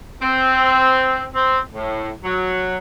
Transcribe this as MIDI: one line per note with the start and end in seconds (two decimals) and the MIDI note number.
0.21 1.24 60
1.35 1.58 60
1.73 2.09 45
2.24 2.77 54